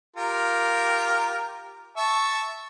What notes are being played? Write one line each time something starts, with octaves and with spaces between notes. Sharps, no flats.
F4 G4 A#4
E5 A5 C#6